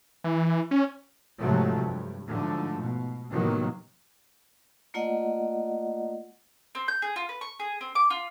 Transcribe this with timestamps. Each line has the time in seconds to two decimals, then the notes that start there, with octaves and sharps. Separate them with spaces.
0.24 E3
0.71 C#4
1.39 G#2 C3 F3 F#3 G#3 A3
1.84 G2
2.28 G#2 D3 F3 F#3 A3
2.81 B2
3.30 A2 C3 D#3 F#3 A#3 B3
4.94 A3 A#3 F4 D5 D#5 F#5
6.75 C4
6.88 G6
7.02 G#4
7.16 F4
7.29 B4
7.41 C#6
7.60 G#4
7.81 C4
7.95 D6
8.10 F4